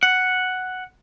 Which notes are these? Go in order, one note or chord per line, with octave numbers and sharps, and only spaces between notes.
F#5